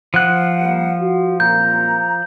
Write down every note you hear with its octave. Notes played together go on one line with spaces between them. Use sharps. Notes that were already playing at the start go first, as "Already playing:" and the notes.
F3 F#5 F#6
G3 A#3
F#4
C2 F#2 A#2 A#5 G6